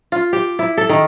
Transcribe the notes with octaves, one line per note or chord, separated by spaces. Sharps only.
F4
G4
E4
A4
D#3